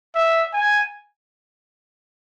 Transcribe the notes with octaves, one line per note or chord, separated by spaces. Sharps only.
E5
G#5